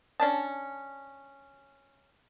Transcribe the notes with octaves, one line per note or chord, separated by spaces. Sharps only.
C#4 D4 A5